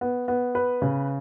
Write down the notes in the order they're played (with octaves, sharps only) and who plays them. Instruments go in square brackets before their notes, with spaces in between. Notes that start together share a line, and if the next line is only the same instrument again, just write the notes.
[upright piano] B3
B3
B4
C#3